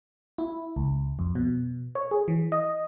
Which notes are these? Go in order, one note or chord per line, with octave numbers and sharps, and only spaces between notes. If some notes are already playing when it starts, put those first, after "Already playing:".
E4
C#2
F2
B2
C#5
G#4
E3
D#5